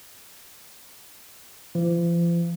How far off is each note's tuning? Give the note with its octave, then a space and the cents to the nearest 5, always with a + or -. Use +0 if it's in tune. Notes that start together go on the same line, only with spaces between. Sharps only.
F3 -40